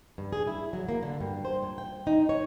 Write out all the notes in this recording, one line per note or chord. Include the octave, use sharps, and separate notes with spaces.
G2
G#4
E4
F#3
A#3
D3
G2
C5
A#2
G5
D#4
C#5